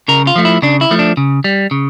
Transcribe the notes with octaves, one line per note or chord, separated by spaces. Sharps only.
C#3 A#4
F4
F3 A3
E4
C#3 D4
E4
F3 A3
D4
C#3
G3
C#3